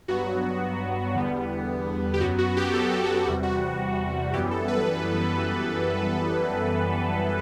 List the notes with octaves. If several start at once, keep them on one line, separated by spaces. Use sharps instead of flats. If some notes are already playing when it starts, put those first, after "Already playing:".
G2 F#3 B3 F#4
E2 D3 G3 B3
G4
F#2 F#3 B3 F#4
F#4
G4
A4
A4
F#4
G4
E2 C3 G3 F#4
F#4
F#2 E3 G3 B3 G4
A4
B4